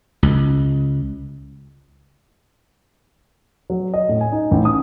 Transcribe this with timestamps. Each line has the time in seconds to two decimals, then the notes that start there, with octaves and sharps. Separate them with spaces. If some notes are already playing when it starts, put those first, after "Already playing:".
0.23 C#2
3.70 F#3
3.94 D#5
4.09 A2
4.21 G#5
4.32 D#4
4.51 A1
4.65 D#6